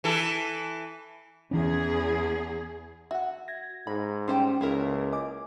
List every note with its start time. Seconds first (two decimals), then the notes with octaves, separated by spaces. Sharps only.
0.04 E3 A4
1.51 E2 E3 C#4 G#4
3.11 F#4 E5 F#5
3.48 G#6 A#6
3.87 G#2 B5
4.28 G3 C#4 C5 G5 C6
4.61 C#2 A#3 E4 A#4
5.12 D#5 G#5 D6